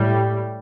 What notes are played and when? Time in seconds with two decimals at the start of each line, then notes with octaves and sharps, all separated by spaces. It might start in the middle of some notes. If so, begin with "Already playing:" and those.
Already playing: A2 G3